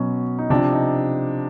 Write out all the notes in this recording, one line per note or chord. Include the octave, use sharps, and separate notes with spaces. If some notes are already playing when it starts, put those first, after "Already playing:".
Already playing: B2 F#3 C#4
D#4
C3 F3 D4
D#4